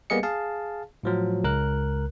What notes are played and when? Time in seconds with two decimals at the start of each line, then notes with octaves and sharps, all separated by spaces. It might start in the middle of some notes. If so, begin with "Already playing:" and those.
0.10 G3 A#3 B3 G#4 D#5 C#7
0.23 G#4 F5 A5
1.03 A2 F3 F#3
1.44 C#2 A#4 F#6